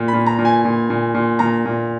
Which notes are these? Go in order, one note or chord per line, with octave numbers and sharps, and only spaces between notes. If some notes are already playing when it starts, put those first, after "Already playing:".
Already playing: A#2
B5
A#2
A#5
A#2
G#5
A#2
A#2
A#2
A#2 A#5
A#2